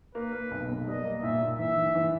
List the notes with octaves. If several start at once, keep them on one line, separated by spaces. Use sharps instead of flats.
A#3 B4
A#3
B1
B1
G3 D#5
A#3
A#2 E5
A#2
E3 E5
E3
E3